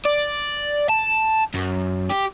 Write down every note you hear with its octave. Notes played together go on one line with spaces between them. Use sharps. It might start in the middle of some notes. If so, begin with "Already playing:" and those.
D5
A5
F#2
G4